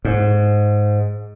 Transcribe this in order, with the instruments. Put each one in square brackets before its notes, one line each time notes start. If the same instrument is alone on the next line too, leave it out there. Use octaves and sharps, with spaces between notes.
[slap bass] G#2